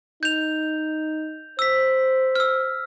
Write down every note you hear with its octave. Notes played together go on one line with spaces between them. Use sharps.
D#4 G6 F7
C5 E6 B6
E6 F6